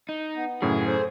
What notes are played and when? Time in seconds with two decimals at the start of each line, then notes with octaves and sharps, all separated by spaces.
0.09 D#4
0.36 B3
0.62 F#2 A2 C#3 G#4
0.86 A4 C5